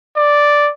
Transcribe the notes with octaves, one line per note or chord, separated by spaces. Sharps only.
D5